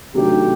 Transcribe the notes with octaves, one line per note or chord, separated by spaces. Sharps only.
C3 D#3 F#3 A3 D4 G4